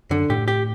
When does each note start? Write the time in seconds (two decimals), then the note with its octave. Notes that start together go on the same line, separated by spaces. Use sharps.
0.10 F#2 D3
0.30 A2 G4
0.48 G4